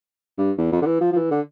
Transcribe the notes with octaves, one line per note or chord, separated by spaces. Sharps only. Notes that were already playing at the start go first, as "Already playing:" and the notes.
G2
E2
F2
D3
E3
F3
F3
E3
D3